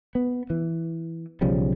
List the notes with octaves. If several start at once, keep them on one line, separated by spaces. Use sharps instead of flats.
B3
E3
B1 C#3 F3 G3